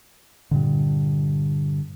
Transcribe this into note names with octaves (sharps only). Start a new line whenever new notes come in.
G2 A#2 D3